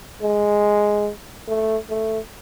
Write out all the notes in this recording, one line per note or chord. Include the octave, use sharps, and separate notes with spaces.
G#3
A3
A3